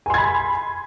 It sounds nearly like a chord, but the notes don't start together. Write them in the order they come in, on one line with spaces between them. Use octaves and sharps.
G#5 C6 G#6 B5